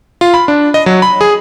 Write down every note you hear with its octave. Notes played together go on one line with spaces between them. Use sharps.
F4
B5
D4
D#5
F#3
B5
G#4